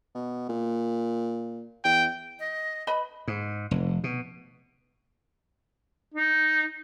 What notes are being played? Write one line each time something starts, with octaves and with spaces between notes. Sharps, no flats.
B2
A#2
E2 G5
D#5
B4 D#5 B5
G#2
F1
B2
D#4